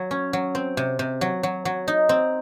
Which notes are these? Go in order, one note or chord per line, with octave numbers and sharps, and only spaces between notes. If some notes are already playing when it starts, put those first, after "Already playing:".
Already playing: F#3
C#4
F#3
C4
C3
C3
F#3
F#3
F#3
D#4
C4